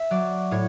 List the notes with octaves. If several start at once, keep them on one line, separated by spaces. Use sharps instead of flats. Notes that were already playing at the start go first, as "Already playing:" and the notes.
Already playing: E5
F#3 D5
A2 C#5